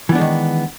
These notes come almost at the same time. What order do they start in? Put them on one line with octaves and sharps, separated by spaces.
E3 B3 D4 G#3 D#3